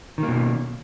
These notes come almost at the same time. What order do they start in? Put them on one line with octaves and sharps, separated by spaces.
D#3 A#3 B2